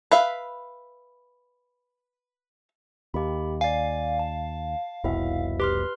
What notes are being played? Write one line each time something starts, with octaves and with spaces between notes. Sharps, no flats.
B4 E5 F5
D#2 G4 B5
D5 F5 G#5
A5
F1 C2 B2 E4 E5
G4 B4 C6 F6